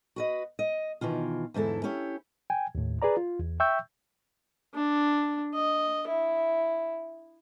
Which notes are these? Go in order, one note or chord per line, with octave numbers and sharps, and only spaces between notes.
F#4 B4 D#5
D#5
B2 D#3 E3 F4
E2 G#2 D3 E4 A4
C#4 E4 G4 C#5
G5 G#5
D#2 A2
G#4 B4 D5 A#5
F4
E2
E5 G5 C#6 E6 G6
D4
D#5
E4